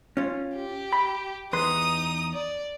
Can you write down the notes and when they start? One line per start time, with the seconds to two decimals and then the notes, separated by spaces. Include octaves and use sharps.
0.17 C#4 F4
0.56 G4
0.92 B5
1.53 E2 D#4 B4 C6 D#6
2.33 D5